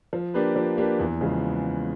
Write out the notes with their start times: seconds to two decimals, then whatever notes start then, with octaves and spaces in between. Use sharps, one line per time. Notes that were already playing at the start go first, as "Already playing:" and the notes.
0.13 F3
0.34 A#3 D4 G4 B4
0.56 F3
0.77 A#3 D4 G4 B4
0.99 E2
1.21 C#3 F3 G#3 B3